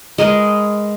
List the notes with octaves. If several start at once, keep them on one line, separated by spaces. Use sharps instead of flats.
G#3 A#4 B4 D#5